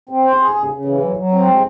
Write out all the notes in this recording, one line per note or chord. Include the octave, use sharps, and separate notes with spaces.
C4
C5
G#4
C#3
C#3
E3
F#3
F#3
C4
G#3